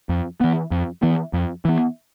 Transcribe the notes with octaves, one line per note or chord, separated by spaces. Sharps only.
F2
E3 B3
F2
E3 B3
F2
E3 B3